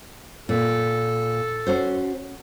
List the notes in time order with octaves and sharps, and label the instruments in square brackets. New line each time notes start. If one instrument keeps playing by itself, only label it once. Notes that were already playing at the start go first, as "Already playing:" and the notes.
[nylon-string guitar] A#2 [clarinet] A4
[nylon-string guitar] C#4 F#4 C5